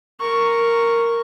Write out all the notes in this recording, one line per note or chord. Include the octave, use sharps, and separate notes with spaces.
A#4 C#6